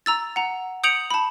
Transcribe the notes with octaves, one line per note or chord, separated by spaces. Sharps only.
A#5 E6 A6
F#5 A#5
D#6 G6 C#7 D7 F7 F#7
A5 B5